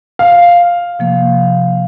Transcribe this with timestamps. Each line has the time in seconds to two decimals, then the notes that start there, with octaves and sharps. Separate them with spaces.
0.19 F5
0.99 C3 F3 A#3